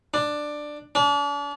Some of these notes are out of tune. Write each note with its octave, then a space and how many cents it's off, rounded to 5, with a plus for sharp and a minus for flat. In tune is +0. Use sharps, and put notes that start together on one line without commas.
D4 +10
D4 -40